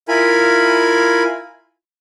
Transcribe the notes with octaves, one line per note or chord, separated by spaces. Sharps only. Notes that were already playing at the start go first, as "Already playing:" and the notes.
E4 F4 A#4 G#5 B5